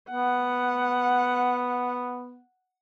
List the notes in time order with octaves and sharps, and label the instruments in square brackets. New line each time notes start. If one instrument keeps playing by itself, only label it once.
[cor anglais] B3 [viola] F#5